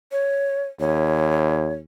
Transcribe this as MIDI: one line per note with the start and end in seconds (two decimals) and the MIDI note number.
0.12 0.65 73
0.80 1.82 39
0.80 1.74 73